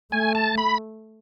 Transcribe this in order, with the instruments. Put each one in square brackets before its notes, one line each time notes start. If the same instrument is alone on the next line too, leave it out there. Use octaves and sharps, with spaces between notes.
[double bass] A3 [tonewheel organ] G#5
[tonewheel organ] A5
B5